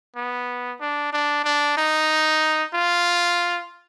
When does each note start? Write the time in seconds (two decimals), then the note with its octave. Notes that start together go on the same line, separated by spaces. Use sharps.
0.16 B3
0.80 D4
1.13 D4
1.44 D4
1.77 D#4
2.74 F4